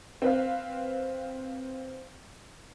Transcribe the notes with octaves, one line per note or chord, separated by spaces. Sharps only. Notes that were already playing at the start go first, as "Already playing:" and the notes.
C4 B4 F5